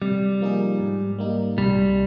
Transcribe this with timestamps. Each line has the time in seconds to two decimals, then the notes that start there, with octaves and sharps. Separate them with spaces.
0.02 C3 G3
0.41 F3 A#3 D#4 G#4
0.80 G#2
1.19 G3 A#3 D#4
1.58 C2 G3